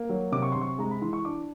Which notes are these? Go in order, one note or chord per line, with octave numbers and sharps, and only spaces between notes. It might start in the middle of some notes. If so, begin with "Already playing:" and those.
Already playing: A#3
F#3
C3 D6
C#6
C3 C6
C#6
G#3 A#5
B5
E3 C6
C#6
D4 D6